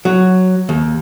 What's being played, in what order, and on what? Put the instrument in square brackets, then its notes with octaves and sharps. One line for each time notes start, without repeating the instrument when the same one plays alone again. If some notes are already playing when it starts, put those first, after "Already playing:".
[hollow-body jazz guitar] F#3
D#2